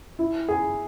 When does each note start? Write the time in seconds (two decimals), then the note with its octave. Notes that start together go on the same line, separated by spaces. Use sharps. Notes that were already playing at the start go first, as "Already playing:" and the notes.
0.19 E4
0.48 G#4